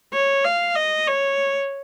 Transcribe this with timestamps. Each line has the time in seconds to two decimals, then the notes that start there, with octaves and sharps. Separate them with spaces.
0.13 C#5
0.45 F5
0.76 D#5
1.07 C#5